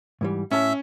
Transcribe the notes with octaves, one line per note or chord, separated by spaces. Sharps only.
G#2 E3 G3
A2 C#4 E5 A5